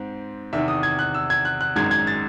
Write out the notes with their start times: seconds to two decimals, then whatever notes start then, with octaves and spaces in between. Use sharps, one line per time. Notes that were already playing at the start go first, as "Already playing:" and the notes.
Already playing: G#2 C4
0.53 E2 C3 D#3 E5
0.68 D#6
0.83 G#6
0.99 F#6
1.14 E6
1.30 G#6
1.45 F#6
1.61 F#6
1.76 G#1 F#2 D#3 G#3 G#6
1.91 G#6
2.07 A6